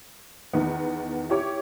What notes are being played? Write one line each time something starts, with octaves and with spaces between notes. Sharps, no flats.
E2 D#3 B3
E4 G4 C#5 D6